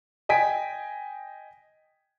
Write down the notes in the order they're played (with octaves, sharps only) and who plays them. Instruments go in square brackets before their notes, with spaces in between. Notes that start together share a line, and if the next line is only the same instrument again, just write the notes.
[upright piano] D#5 G5 G#5 B6 D7